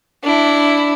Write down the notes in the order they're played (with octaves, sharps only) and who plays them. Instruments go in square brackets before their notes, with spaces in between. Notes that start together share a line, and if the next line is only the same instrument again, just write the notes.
[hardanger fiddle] D4 E4